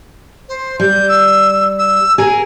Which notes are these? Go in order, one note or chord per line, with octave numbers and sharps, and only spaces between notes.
C5
G3 G6
E6
E6
G#4 A#4 G#5